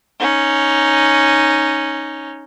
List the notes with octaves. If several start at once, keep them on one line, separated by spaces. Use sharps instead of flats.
C#4 D#4